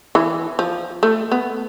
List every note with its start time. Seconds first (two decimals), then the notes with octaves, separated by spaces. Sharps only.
0.15 E3
0.59 F3
1.03 A3
1.32 B3